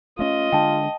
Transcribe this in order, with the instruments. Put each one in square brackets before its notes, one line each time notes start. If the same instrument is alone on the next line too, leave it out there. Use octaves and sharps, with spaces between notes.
[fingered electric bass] A3 C#4 [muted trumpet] F4 [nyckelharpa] D#5
[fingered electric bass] D3 G#3 D4 [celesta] G5 A5